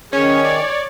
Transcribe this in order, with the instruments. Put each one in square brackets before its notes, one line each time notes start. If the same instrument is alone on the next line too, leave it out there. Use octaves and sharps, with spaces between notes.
[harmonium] D#3 G#4 [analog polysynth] C#4 [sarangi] C#5
[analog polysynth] D5